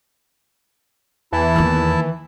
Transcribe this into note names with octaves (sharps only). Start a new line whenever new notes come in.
E2 E3 E4 A5
D#3 A#3